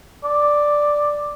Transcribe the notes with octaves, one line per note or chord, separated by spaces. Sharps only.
D5